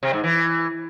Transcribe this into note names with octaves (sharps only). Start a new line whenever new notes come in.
C3
G#2
E3